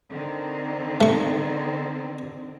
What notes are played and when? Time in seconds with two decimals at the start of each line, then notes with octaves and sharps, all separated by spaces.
0.10 D3 D#3 C4
1.01 A3 C#6